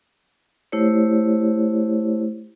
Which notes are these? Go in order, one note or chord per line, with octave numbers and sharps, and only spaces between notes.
A3 E4 G4 C5 C#5